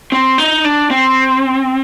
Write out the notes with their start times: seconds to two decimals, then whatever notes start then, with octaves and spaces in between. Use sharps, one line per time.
0.12 C4
0.38 D#4
0.64 D4
0.90 C4